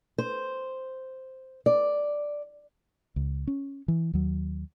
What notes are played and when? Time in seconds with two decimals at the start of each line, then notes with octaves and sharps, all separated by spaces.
0.18 C5
1.66 D5
3.16 C#2
3.47 C#4
3.88 E3
4.13 D#2 F#3